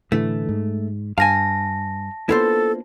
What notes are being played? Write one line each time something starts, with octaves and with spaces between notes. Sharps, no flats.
A2 D3 E3 A3
G#2
G2 F5 G#5 A5 A#6
A#3 B3 D4 E4 F4 A4 C5